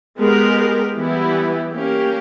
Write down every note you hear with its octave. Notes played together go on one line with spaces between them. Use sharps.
G#3 B3 G4 A#4
E3 G3 B3 E4 G4
A#3 C#4 G4